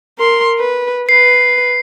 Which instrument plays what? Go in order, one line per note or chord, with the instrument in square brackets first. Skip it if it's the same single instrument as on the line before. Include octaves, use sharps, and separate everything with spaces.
[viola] A#4 C6
B4
[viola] B4 [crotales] C7